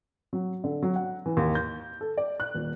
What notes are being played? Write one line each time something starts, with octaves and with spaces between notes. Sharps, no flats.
F#3
D3
F#3
F#5
E3
D#2
G6
A4
D5
F#6
D#1